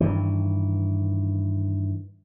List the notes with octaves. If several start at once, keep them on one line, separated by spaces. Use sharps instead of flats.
G2 D#3 E3